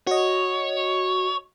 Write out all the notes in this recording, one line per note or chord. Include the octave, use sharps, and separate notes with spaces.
F#4 C#5 D#5